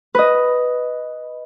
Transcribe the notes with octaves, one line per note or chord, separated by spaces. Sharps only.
B4 D#5